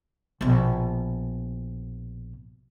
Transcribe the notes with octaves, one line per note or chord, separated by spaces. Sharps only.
A#1 B2